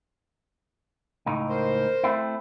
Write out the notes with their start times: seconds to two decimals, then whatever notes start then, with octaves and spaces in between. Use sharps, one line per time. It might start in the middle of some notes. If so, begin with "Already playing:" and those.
1.26 C#2 A2 D#4
1.49 A#4 C5
2.04 A3 C4 E4